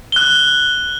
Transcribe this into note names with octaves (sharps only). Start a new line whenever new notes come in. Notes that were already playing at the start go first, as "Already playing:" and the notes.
F#6 G7